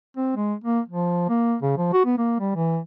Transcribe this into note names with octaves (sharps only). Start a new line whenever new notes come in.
C4
G#3
A#3
F3
A#3
C#3
F3
F#4
B3
A#3
G3
E3